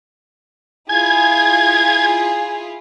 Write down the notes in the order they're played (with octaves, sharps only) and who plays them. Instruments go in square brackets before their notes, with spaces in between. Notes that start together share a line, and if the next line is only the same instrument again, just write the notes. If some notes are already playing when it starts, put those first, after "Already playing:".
[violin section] E4 F4 G#4 [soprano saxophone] G#5 [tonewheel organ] G#6